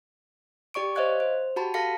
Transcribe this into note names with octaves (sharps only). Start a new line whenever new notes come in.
G4 D5 C#6 D7
C5 C#5 D#5 F5 F#6 G#6
C5
F#4 G4 A5 B5
A4 F5 A5 A#6 B6 C#7